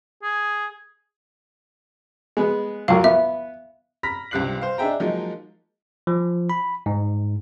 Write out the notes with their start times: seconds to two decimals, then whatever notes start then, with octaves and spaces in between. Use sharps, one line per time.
0.23 G#4
2.37 G#3 B3
2.88 C#2 F#2 A#4 F5
3.04 B3 E5
4.03 A#5 B5 F6 A#6 B6
4.31 C#2 G2 C3 F#6 C7 F#7
4.61 C5 F5
4.78 D4 D#4 G#4 E5 G5 A#5
5.00 F3 F#3 G#3 A#3 D#4
6.07 F3
6.50 B5
6.86 G#2